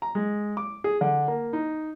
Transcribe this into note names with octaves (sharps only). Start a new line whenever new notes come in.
A#5
G#3
D6
G#4
D3
A#3
D#4